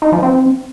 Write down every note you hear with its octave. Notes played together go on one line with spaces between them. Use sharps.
D#4
F3
C4